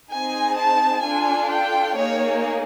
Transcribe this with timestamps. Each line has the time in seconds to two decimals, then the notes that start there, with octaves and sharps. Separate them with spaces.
0.13 C4 D#4 G#4 G#5
0.58 A5
1.05 D4 F4 A4 G#5
1.51 G5
1.97 A#3 D#4 G#4 C#5